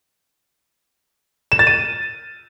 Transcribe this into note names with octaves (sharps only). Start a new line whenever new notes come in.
E7
A6
D#7